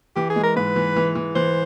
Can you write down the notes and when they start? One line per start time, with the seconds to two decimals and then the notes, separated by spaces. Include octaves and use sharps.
0.16 E3 G4
0.30 G#4
0.36 G#3
0.43 A#4
0.56 G#2 B4
0.76 E3
0.96 E3
1.15 E3
1.35 E3 C5